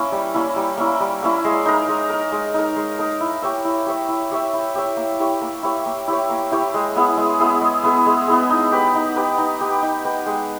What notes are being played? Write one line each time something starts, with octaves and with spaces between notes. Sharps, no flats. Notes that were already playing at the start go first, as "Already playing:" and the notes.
Already playing: A#3 C#4 E4
G3
A#3 C#4 E4
G3
A#3 C#4 E4
G3
A#3 C#4 E4
G#3
D#4 A#4
G#3
D#4 A#4
G#3
D#4 A#4
G#3
D#4 A#4
E4
G4 C#5 E5
E4
G4 C#5 E5
E4
G4 C#5 E5
E4
G4 C#5 E5
A#3
E4 G4 C#5
A#3
E4 G4 C#5
A#3
E4 G4 C#5
A#3
E4 G4 C#5
G#3
B3 E4 G#4
G#3
B3 E4 G#4
G#3
B3 E4 G#4
G#3
B3 E4 G#4
D#4
G4 B4
D#4
G4 B4
D#4
G4 B4
D#4
G4 B4
G#3